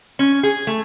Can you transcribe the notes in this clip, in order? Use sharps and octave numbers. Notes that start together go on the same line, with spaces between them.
C#4
G#4
A3